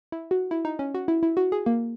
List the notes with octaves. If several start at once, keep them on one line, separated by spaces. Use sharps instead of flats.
E4
F#4
E4
D#4
C#4
F#4
E4
E4
F#4
G#4
A#3